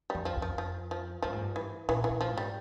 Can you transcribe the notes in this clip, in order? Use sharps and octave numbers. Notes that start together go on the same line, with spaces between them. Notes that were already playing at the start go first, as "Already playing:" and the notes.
F2 G3
F3
F2
F3
F3
F3
G2 F3
G#2
G2
E3
A#2 E3
E3
A#2
F3
G#2
G3